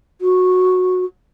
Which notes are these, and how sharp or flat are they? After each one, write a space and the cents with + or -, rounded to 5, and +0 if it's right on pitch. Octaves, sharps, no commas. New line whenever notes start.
F#4 -15